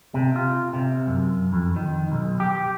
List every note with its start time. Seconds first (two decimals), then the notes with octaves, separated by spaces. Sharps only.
0.14 C3
0.36 F4
0.73 C3
1.07 F#2
1.53 F2
1.76 D#3
2.12 B1
2.40 G4